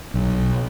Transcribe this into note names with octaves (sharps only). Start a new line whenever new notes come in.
B1